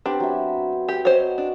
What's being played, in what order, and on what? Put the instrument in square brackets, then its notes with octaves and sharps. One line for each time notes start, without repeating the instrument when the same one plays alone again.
[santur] B3 C4 G4 [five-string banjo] D4
[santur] F#3 E5
[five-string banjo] G4
[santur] F#4 D#5 [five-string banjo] C5 C#5
[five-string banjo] D4